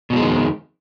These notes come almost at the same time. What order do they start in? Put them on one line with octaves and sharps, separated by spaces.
B2 F#3 G#3 F2 D#3